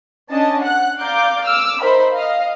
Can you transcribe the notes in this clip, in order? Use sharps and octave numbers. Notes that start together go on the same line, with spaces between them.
C#4 D4 D#5 A5
F#5 F#6
D5 F5 A#5 D6 G6
D6 E6 F6
D#4 A#4 C5 E5 B5
D#5 F5